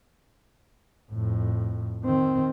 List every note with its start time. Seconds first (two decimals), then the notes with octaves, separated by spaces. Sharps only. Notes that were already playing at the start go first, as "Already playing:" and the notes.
1.11 F2 A2
2.04 D#3 C4